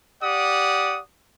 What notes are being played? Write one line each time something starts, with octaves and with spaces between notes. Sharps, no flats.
G4 D5 F#5 D#6